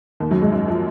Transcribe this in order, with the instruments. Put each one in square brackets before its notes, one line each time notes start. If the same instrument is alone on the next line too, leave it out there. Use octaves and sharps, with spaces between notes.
[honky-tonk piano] D#2 D#3
F#2 F#3
G#2 G#3
F#2 F#3
F3